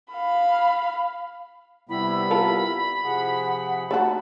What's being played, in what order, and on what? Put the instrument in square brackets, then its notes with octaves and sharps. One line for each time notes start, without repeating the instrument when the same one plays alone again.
[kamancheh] F5 B5
[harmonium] C3 G3 B3 [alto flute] E4 [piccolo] B5
[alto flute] E4 [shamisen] F4 A4 A#4
[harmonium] C3 F3 G#4 [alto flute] F#5
[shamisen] A3 D4 F#4 [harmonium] D#4